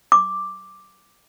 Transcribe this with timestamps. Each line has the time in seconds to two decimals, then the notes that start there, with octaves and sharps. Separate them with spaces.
0.12 D6